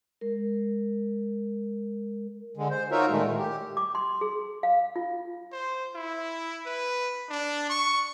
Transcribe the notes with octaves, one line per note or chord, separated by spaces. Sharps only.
G#3 A#4
D3 G#3
C5
D#4 F4 F#4 A#4 C#5 E5
A#2 D#3 G#3 A3
A2
G4
D6
C6
G#4
F5
F4
C5
E4
B4
D4
C#6